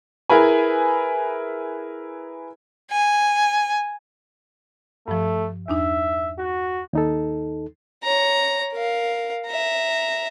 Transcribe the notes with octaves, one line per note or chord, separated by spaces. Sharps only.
E4 G#4 A#4 B4 G#5
G#5
G2 F3 A3
E2 D4 D#4 E5
F#4
D#2 D#4 A4
C#5 A#5
A#4 F5
E5 A#5